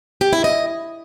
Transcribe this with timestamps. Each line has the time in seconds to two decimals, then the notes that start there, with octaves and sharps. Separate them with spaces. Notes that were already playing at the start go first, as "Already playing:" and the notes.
0.21 G4
0.33 E4
0.44 D#5